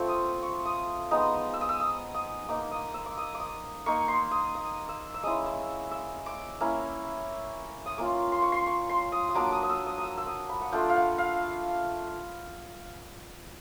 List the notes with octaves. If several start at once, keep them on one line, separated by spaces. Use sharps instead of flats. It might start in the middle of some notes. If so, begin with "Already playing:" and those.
Already playing: A3 C4 F4 C#6
D#6
C#6
D#6
G#3 B3 D#4 D#6
E6
D#6
E6
D#6
D#6
A#3 D#4 D6
D#6
E6
D6
D#6
D6
D#6
A#3 D#4 C#6
C6
D#6
D#6
E6
E6
G#3 C#4 E4 D#6
E6
E6
D6
A#3 C#4 E4
D#6
A#3 C#4 F4 D6
C6
C#6
C6
C#6
C6
D#6
D#6
F#3 A#3 D4 D6
D#6
D#6
E6
D#6
D#6
E6
E6
D#6
B5
F#5
A3 D4 F4 G5
F5
F#5
F5